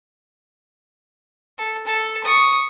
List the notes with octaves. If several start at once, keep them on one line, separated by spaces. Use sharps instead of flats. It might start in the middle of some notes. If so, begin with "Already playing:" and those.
A4
A4 A5
C#6 D#6